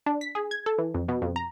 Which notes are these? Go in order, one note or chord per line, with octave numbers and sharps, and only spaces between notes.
D4
B6
G#4
G#6
A4
E3
F2
B2
F2
A#5